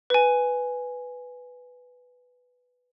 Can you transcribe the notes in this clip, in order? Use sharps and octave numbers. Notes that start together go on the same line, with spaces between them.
B4 G#5